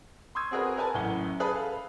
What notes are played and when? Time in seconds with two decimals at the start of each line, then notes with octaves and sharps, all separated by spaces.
0.35 C6 C#6 D#6 E6 G#6
0.51 C4 F#4 G#4 A#4 B4
0.77 A#4 B4 G#5 A5
0.94 A1 F#2 A2 F#5 G7
1.40 G#4 B4 A5 B5
1.55 A4 F5